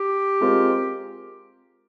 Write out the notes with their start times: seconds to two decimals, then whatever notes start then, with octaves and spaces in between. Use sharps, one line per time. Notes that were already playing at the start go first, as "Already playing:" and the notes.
Already playing: G4
0.41 G#3 C4 F4 A#4